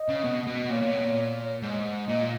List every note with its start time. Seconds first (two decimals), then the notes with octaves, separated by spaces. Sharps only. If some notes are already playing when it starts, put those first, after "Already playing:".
Already playing: D#5
0.08 C#3
0.24 B2
0.47 B2
0.69 A#2 C#5
0.82 A#2
0.93 B2
1.04 A#2
1.62 G#2
2.08 A#2 D#5